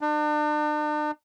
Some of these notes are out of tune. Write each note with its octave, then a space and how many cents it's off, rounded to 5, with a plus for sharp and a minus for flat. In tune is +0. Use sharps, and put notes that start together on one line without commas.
D4 +40